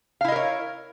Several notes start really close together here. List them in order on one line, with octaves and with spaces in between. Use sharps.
F5 E4 D#5 A#4 C#5